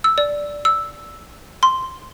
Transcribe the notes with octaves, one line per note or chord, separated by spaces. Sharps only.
E6
D5
E6
C6